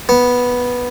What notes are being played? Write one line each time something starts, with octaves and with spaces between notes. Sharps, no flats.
B3